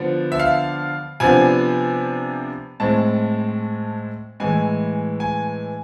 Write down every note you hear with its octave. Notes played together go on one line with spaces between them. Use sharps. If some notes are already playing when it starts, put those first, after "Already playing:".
Already playing: D3 F3 B3 D4
E5
F5
C3 F3 B3 D4 G#5
A2 G#3 C4 A5
A2 E3 G#3 G#5
G#5